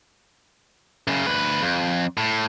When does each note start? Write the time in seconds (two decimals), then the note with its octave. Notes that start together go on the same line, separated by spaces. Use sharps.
1.07 F#2 C#3
1.26 D2 B4
1.63 F2
2.17 A2